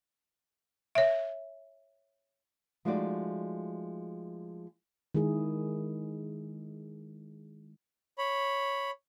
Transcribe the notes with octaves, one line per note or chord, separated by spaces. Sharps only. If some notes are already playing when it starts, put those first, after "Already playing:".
C#5 E5
F3 G#3 A3 D#4 F#4 D5
D#3 G#3 E4 G#4
C#5 B5